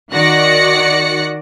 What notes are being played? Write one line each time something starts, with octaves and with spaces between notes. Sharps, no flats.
D#3 F#4 D5 F#6 A#6 C#7